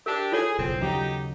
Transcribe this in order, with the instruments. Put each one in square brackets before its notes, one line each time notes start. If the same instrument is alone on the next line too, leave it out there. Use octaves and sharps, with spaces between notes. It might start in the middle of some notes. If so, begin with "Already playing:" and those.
[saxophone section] D4 G4 [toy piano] A#4
[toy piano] F4 A4 C#5 [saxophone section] G#4
[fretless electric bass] F#1 B1 [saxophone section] C4
[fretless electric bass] D#2 C#3 F#3 [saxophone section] D#4 G4